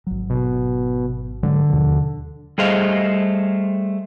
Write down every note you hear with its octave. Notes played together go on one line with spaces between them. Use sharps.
G#1 F#3
B2
G#2 D3 F#3 G#3
D#2 B2 F3
G3 A3 G#4 C5 D#5 F5